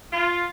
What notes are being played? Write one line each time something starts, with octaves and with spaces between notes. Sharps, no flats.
F4